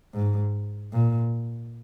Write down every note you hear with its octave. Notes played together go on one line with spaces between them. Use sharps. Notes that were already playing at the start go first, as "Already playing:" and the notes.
G#2
A#2